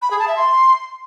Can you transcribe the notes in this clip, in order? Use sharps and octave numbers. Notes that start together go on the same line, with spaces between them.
B5
G#4
A5
E5
C6